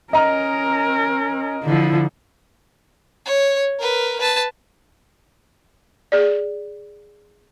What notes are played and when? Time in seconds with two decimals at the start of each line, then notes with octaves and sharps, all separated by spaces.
0.13 C#4 A#4 D#5 A#5 F6
1.64 D3 F3 E4
3.26 C#5
3.80 A#4 B4
4.19 B4 A5
6.12 G#4 D5